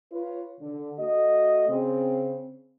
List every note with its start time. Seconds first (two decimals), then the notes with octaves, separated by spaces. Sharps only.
0.11 F4 B4 C#5
0.60 D3
0.98 A3 F#4 D#5
1.68 C#3 C4